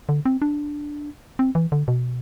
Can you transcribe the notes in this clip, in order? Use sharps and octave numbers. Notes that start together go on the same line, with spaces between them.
D3
C4
D4
C4
E3
D3
B2